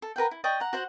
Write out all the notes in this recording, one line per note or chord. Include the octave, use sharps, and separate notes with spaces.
A4
A#4 B4 F#5 G5
E4
D5 D#5 G5 C#6
F#5 A#5
F#4 C5 F#5